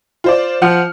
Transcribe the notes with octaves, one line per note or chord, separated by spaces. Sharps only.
F4 C5 D5
F3 F#5 F6